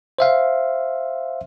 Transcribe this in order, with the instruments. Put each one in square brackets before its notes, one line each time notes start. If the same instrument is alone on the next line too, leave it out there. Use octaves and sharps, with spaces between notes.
[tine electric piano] C5 E5 F5